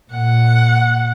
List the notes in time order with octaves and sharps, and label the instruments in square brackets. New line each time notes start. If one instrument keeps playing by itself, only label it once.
[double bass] A#2 [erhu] F#5